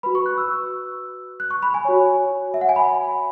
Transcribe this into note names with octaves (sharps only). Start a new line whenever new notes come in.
F#4 B4 B5
C#6
F#6
E6
F#6
C#6
B5
G#5
F#4 C#5
E5
F#5
G#5
B5